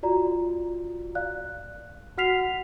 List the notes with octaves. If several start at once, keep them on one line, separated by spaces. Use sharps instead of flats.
F4 F#4 D5 A#5
D5 F5 F#6
F#4 F#5 F6 B6 C7 F7